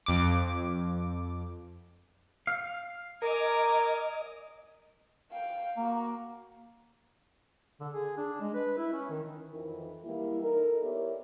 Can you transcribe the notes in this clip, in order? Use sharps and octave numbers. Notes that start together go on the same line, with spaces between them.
F2 D6
F5
A#4 D#5 G#5 A#5 D6
F5 G5
A#3 F#4 F5
D3
G#4
D4
G#3
B4
E4
C#4
D#3
F2 D#3 E3
E3 G3 G#3 A#3 E4
D#4 A4 A#4
B3 E4 G4 A#4 C#5 D5